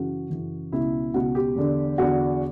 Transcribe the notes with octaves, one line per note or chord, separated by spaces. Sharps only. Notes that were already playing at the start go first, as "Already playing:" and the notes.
Already playing: F#2 C#3 E3 F#4
F#2 C#3 E3
C#2 B2 E4
C#2 B2 F#4
G4
E2 D3
E2 D3 F#4